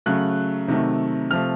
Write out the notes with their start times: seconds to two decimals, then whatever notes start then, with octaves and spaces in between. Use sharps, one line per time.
0.06 C#3 F#3 A3 F#6
0.68 C3 D#3 F#3 A3
1.30 C3 F3 A3 F6